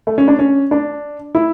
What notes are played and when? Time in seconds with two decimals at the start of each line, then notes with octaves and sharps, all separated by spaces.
0.07 A3
0.18 C#4
0.28 D4
0.39 C#4
0.71 D4
1.35 E4